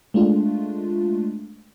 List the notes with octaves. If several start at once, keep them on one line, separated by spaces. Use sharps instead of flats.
G#3 A3 D4 F4